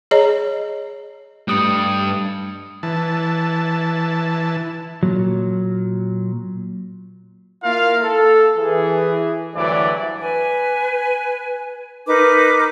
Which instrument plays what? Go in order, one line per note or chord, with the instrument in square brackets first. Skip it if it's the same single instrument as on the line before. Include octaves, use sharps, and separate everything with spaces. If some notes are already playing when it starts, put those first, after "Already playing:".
[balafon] G#4 C#5 D#5 A#5
[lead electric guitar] G2 G3 [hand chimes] A3 D#6 C#7
[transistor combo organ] E3 A5
[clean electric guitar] A#2 F#3
[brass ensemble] A#3 E4 F4 A#4 F5
A4
E3 G#4
D2 G2 E3 F#3 D5
[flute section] B4 G#5
D#4 A#4 B4 D6